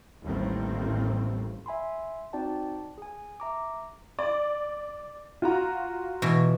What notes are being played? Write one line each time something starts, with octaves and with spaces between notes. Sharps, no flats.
A1 D#2 A2 G3 C4
E5 G#5 B5 C6
C4 D#4 F#4 D5 G5 A5
G#4 G#5
E5 A#5 D6
D5
F4 F#4 A#5
B2 E3